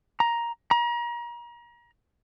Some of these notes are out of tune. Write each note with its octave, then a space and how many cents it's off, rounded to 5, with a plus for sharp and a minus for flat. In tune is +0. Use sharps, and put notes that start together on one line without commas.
A#5 +10
A#5 +35